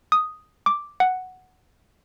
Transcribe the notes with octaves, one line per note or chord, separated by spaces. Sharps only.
D#6
D6
F#5